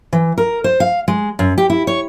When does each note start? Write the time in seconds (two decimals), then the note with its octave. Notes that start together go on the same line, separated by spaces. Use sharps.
0.13 E3
0.38 A#4
0.64 C5
0.80 F5
1.08 G#3
1.39 F#2
1.58 G4
1.70 E4
1.87 C#5